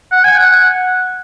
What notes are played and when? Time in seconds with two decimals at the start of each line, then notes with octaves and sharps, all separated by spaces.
0.11 F#5
0.24 G#5
0.37 F#5